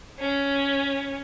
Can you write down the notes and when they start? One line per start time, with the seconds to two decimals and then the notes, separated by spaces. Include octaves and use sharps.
0.20 C#4